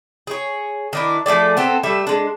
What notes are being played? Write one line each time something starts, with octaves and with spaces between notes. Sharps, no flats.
G#4 C#5
D#3 D4 E4
F3 A3 G#4 D5
B3 C4 A4
G3 A3 E5
G#3 D4